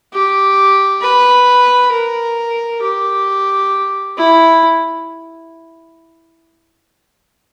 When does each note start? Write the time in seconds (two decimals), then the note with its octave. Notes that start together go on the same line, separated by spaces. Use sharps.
0.13 G4
1.02 B4
1.92 A#4
2.82 G4
4.18 E4